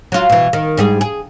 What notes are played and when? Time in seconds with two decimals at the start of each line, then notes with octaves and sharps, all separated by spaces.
0.12 F#3 F4
0.30 B2 E3
0.53 D#3
0.77 G#2 G3 G#4
1.01 G#4